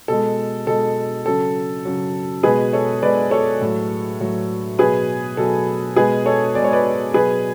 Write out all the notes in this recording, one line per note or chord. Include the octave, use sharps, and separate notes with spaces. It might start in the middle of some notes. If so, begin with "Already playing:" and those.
B2 G#3 A4
B2 G#3 A4
C#3 F#3 A4
C#3 F#3
B2 G#3 G#4 B4
A4 C#5
B2 G#3 B4 D5
A4 C#5
A2 F#3
A2 F#3
B2 F#3 G#4 B4
B2 F#3 A4
B2 G#3 G#4 B4
A4 C#5
B2 G#3 D5
C#5
B4 D5
B2 F#3 G#4 B4